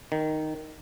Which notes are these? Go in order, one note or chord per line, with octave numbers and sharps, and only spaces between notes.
D#3